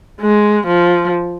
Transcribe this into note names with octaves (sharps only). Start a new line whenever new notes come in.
G#3
F3